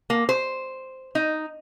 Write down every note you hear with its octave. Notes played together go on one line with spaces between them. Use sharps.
A#3
C5
D#4